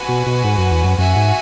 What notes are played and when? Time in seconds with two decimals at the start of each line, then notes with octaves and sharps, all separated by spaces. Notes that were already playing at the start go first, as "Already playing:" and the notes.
Already playing: F#4 B4 G#5
0.09 B2
0.27 B2
0.44 G#2
0.58 F#2
0.71 E2
0.84 F#2
0.98 F#2 F#4 E5 G#5
1.16 G#2